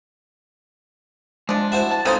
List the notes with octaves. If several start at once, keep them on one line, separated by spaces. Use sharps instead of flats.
F3 G#3 D4
E4 F#4 C5
A5
C#3 C4 D#4 F4 A4 C5 F5